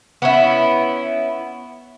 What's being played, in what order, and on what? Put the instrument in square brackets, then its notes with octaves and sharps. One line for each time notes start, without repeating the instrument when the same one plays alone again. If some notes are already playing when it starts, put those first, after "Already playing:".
[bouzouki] B3 C#4 E4